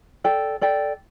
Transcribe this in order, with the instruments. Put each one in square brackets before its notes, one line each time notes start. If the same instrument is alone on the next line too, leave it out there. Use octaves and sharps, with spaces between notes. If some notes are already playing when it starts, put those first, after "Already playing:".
[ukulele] A4 D5 G5
A4 D5 G5